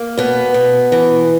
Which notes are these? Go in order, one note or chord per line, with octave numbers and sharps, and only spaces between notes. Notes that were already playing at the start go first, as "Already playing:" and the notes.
Already playing: A#3
B2 B3
B2
E3